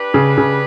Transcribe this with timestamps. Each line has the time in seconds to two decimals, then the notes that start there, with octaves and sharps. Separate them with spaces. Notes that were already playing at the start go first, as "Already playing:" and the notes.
Already playing: D4 G4 B4
0.14 C#3
0.38 C#3